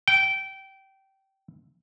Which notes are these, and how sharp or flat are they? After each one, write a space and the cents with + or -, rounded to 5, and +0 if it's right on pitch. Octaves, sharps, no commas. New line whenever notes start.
G5 -20